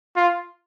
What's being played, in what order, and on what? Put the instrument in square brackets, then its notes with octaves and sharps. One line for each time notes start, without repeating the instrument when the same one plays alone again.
[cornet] F4